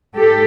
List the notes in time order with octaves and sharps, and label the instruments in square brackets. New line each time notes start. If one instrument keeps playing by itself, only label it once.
[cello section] G#2 G4 A4